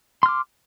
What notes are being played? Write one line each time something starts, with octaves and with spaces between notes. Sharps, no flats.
C6 D6 F6